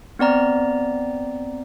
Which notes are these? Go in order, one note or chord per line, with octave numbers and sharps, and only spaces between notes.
B3 C4 D5 A#5